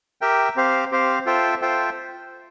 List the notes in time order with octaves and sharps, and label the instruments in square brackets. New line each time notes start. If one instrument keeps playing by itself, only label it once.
[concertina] G4 A#4 E5 G5
C4 G4 C5 F5
C4 G4 C5 F5
F4 A4 C5 E5 G5
F4 A4 C5 E5 G5